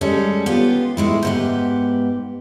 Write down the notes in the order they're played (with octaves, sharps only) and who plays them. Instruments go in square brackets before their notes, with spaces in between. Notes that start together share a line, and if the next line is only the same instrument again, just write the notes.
[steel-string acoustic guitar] G3 G#3 C#4 A4
B3 F4 G4
A2 G#3 E4
G#2 B3 G4